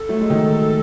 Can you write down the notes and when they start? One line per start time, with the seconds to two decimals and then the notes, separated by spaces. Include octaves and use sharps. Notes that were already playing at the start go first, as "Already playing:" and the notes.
Already playing: A4
0.09 F#3 A3
0.21 G#3
0.30 D#3 F#3